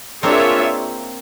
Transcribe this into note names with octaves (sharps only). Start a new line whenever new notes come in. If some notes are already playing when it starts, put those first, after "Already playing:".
A#3 C4 D4 F4 G#4 C#5 E5